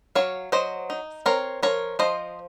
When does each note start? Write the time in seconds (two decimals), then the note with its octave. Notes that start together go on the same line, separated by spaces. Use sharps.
0.15 F#3 C#5 F5
0.52 F#3 C5 D#5
0.90 D#4
1.26 C4 A#4 C#5
1.63 F3 A#4 C#5
1.99 F3 C5 D#5